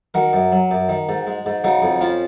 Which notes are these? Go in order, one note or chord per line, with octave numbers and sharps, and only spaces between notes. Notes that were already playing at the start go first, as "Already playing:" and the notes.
D#3 F#4 A#4
F#2
F#3
F#2
D#3
G#2
G#3
G#2
C#3 D#4 F#4
F2
F3 C#4 F4